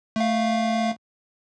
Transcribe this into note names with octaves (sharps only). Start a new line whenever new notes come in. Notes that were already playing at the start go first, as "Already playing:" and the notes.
A3 F5